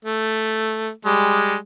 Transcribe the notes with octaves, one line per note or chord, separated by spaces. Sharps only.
A3
G3 G#3